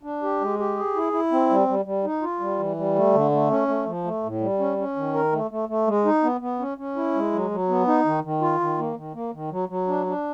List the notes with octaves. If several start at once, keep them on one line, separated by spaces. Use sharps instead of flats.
D4
G4
G#3
G4
G#4
E4
E4
C4
G3
G3
G3
D#4
F4
G3
E3
G3
A3
D3
A3
C#4
A3
F3
A3
A2
G3
C#4
C#4
D#3
A#4
A3
A3
A3
G#3
D#4
B3
B3
C#4
C#4
E4
G#3
F#3
F#3
B3
D#4
D#3
D#3
F4
D#3
A#3
D#3
A#3
D#3
F#3
F#3
D4
D4